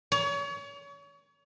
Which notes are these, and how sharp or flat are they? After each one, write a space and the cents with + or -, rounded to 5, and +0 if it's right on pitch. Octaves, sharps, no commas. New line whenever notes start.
C#5 +35